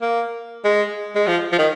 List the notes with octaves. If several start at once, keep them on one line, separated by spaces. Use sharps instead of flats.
A#3
G#3
G#3
F3
F3
D#3